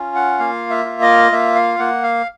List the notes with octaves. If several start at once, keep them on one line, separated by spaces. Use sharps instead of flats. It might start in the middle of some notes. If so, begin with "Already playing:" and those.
Already playing: C#4 F4
F#5
A#3 F5
E5
F4
D#5
A#3 E5
F5
A#3 F#5
F5